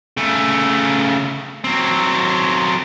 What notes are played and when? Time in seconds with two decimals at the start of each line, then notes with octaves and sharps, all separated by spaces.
0.17 C#3 A3
1.64 F#3 C4